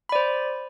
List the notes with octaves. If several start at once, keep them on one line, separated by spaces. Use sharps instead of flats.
C5 D5 B5